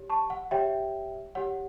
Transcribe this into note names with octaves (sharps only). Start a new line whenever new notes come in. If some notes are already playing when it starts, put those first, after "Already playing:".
Already playing: G4 C#5
A5 C#6
F#5
G4 C#5 E5 G5
G4 C#5 F#5